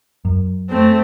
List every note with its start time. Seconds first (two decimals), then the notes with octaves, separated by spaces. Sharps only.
0.25 F#2
0.70 A3 C4